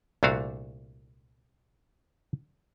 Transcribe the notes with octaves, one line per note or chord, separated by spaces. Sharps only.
C2 A#2 A3 D4 F#4 F5